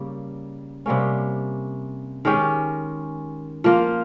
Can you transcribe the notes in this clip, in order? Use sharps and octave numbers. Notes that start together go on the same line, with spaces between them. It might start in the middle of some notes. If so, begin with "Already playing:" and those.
Already playing: C#3 G3 A#3
C3 G3 A#3 C#4
D#3 G#3 C#4 G4
F3 A#3 F4